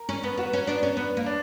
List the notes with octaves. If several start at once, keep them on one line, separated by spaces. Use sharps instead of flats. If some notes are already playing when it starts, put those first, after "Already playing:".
Already playing: A#4
C#4
B3
B3 F#4
C#4
B3 D4
C#4
B3
A#3
D4